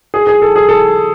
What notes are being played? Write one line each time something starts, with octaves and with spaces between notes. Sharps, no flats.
G#4
G#4
A4
G#4
A4